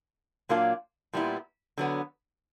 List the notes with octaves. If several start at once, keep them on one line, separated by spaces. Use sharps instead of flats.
A#2 F#3 A#3 D4 F4
A#2 G3 B3 E4
D3 F#3 B3